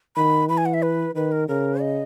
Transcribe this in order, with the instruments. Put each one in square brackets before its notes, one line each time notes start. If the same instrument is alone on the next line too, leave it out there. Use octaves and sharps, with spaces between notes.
[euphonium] D#3 [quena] B5
[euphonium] E3 [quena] B5
[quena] G#5
F#5
E5
B4
[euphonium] D#3 [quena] B4
[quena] A#4
[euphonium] C#3 [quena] A#4
[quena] D#5